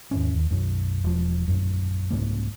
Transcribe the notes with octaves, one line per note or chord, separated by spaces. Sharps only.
D#2 G#2 C#4
D#2
B1 F#2
E1 F3
A#1 F#2
C2 G#2 C#3 A#3